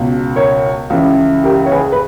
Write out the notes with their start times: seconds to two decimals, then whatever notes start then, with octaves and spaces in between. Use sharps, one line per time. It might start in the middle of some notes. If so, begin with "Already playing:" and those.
Already playing: C#2 B2
0.36 A#4 C#5
0.90 C#2 C#3 E3
1.44 G4 A#4
1.66 C#5
1.72 G#4 B4
1.92 B4